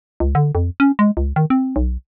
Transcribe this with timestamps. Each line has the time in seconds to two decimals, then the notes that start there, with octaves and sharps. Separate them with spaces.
0.20 C#2
0.35 D3
0.55 F2
0.80 C#4
0.99 G#3
1.17 C#2
1.36 D#3
1.50 C4
1.76 B1